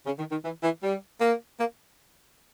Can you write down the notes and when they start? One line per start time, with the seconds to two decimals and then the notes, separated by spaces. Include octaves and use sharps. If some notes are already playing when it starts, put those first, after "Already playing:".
0.06 C#3
0.19 D#3
0.31 D#3
0.45 E3
0.63 E3
0.83 G3
1.21 A#3
1.60 A#3